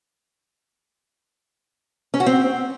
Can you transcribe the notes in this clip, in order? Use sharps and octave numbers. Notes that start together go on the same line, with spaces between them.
C#4
F#4
C4